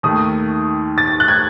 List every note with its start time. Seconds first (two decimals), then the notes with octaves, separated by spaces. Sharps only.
0.03 D#2 D#3 A3 D#6
0.98 A6
1.20 F#6
1.28 G#6